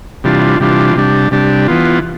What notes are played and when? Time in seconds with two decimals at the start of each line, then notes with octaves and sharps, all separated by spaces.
0.24 C3 E3 G3 D4 F4
0.60 C3 E3 G3 D4 F4
0.96 C3 G3 D4
1.31 C3 G3 D4
1.68 E3 B3 F4